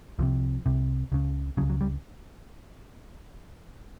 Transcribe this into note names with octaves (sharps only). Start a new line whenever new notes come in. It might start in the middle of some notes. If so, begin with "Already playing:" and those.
C2 C3 F3
C2 C3
C#2 C#3
C#2 C#3 F#3
F#3
G3